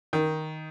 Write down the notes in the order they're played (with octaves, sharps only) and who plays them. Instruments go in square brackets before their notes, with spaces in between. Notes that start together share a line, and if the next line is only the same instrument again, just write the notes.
[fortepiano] D#3